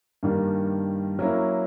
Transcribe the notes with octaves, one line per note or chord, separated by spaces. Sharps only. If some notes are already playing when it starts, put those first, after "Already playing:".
G2 D#3 G3 A#3 D4
F#3 A#3 C#4 E4